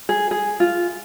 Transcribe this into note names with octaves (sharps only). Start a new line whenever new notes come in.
G#4
G#4
F4